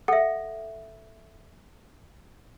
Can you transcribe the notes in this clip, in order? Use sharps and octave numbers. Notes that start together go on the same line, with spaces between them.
A4 E5 F#5